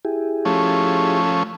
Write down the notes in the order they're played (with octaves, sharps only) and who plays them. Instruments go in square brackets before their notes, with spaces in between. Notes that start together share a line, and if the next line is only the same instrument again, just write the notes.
[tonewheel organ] E4 G4 G#4
[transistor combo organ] F3 A3 C#4